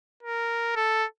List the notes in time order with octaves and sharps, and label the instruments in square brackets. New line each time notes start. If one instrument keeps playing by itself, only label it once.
[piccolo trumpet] A#4
A4